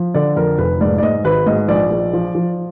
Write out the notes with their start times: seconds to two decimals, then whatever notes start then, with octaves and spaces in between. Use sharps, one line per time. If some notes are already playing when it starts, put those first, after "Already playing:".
Already playing: F3
0.14 D3 D5
0.36 F2 A#4
0.58 F1 B4
0.81 G#2 D5
0.98 D5
1.03 G#2 D#5
1.25 G#1 B4
1.47 G#2 D#5
1.69 A#1 D5
1.91 A#1
2.13 F3
2.35 F3